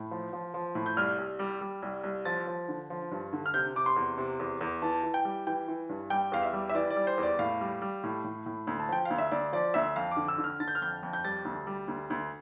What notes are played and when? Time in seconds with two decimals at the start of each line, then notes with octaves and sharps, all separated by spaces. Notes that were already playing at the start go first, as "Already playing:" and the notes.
Already playing: A2
0.11 F3
0.33 F3
0.54 F3
0.75 A2
0.86 G6
0.97 C2 F6
1.18 C2
1.39 G3
1.61 G3
1.82 C2
2.03 C2
2.25 F3 A6
2.47 F3
2.68 D3
2.90 F3
3.11 G2
3.33 D3
3.46 F6
3.54 C3 G6
3.75 C3 D6
3.86 C6
3.96 E2
4.18 C3
4.39 E2
4.61 E2
4.82 E3 A5
5.03 E3
5.14 G5
5.25 G3
5.47 E3 G5
5.68 E3
5.89 G2
6.10 G3 G5
6.32 E2 F5
6.42 E5
6.53 G3
6.69 E5
6.75 E3 D5
6.90 D5
6.96 G3
7.07 C5
7.18 E2
7.23 D5
7.39 A2 F5
7.61 G3
7.81 G3
8.03 A2
8.24 A2
8.46 A2
8.67 D2
8.80 A5
8.89 F3 G5
9.05 D2 F5
9.18 E5
9.31 D2 D5
9.53 F3 D5
9.74 D2 E5
9.96 F2 F5
10.11 D6
10.17 D3
10.28 E6
10.38 D3
10.44 F6
10.60 D3 A6
10.68 G6
10.75 F6
10.81 F2 G6
11.03 F2
11.13 G6
11.25 G3 A6
11.45 D2
11.67 G3
11.88 D2
12.10 D2